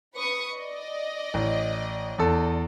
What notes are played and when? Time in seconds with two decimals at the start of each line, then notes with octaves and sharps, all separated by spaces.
0.14 B4 C#6 D#6
0.55 D5 D#5
1.34 A1
2.18 E2 A4